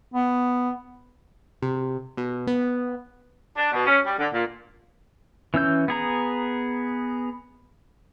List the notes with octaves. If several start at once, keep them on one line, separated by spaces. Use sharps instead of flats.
B3
C3
B2
B3
D4
B2
C#4
G3
D3
A#2
E3 C#4 E6 G6
B3 G#4 A#5